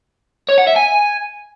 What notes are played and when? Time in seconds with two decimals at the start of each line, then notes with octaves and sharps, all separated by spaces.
0.49 C#5
0.58 F#5
0.67 E5
0.76 G#5